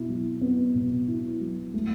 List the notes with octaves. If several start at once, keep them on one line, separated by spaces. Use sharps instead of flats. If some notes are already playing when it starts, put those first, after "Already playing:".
Already playing: B2 E4
F#3
B3
B2
E4
F#3
A3